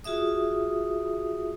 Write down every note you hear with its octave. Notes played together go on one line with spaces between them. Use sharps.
F4 F#4 G#4 E5 D#6